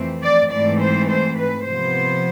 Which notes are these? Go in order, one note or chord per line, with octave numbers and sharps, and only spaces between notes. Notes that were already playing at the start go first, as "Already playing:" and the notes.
Already playing: F2 E3 A3 C4
D5
G#2 E3 A3 C4 D5
C5
C5
B4
C3 F3 B3 C5